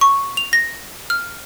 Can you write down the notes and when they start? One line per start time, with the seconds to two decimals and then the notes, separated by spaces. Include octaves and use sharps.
0.01 C#6
0.37 F7
0.53 A#6
1.10 F6